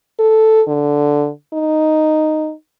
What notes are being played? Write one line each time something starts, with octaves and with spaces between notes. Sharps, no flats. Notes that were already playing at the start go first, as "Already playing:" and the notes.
A4
D3
D#4